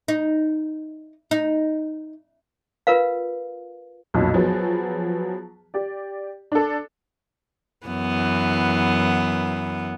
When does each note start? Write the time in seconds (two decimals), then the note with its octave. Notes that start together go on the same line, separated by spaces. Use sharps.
0.08 D#4
1.31 D#4
2.87 F4 A#4 B4 F5
4.14 B1 F2 A#2 F#3
4.34 F3 F#3 B3 G#4
5.74 G4 D5
6.52 D4 A4
7.87 F#2 E3 B3